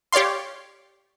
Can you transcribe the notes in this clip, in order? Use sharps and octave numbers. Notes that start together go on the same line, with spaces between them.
G4 C#5 D5 F5 C6